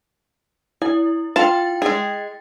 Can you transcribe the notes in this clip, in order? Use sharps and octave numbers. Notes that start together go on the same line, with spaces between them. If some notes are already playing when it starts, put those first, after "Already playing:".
E4 G#5
F4 G5 A5 A6
G#3 G#4